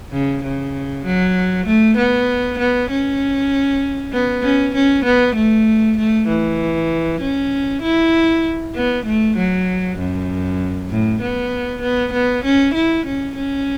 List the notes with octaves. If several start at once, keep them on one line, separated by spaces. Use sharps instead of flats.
C#3
C#3
F#3
A3
B3
B3
C#4
B3
C#4
C#4
B3
A3
A3
E3
C#4
E4
B3
A3
F#3
F#2
A2
B3
B3
B3
C#4
E4
C#4
C#4